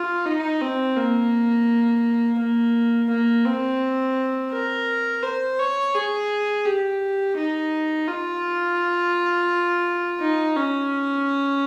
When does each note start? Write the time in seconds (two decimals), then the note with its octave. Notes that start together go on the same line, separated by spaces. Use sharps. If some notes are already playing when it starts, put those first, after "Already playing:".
Already playing: F4
0.26 D#4
0.61 C4
0.97 A#3
2.39 A#3
3.10 A#3
3.45 C4
4.52 A#4
5.23 C5
5.59 C#5
5.94 G#4
6.65 G4
7.37 D#4
8.07 F4
10.20 D#4
10.56 C#4